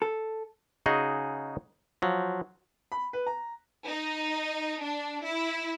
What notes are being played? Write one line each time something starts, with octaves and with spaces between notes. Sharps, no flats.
A4
C#3 D#4 F#4 G#4 D#5
F3 F#3
B5
B4
A#5
D#4
D4
E4